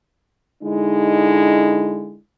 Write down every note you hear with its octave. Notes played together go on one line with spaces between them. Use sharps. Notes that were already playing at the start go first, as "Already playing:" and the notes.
D3 G#3 D#4 E4